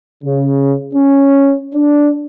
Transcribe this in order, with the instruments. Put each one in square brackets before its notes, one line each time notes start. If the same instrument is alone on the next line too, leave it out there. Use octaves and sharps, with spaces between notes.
[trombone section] C#3
C#4
D4